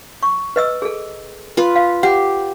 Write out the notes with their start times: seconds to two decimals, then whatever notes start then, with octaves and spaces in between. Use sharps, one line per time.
0.23 C#6
0.56 B4 D#5 E6
0.82 G#4 A4
1.57 F4 B4
1.76 F5
2.03 G4 F#5